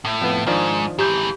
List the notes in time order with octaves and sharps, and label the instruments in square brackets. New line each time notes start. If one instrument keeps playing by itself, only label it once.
[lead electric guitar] A2
[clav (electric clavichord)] F2 B3
[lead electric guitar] G#2 [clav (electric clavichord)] D#3 F3 D4
[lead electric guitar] G#2 E3 [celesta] G4 G6